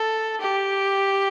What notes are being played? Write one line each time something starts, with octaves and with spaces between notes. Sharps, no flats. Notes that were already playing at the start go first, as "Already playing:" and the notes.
Already playing: A4
G4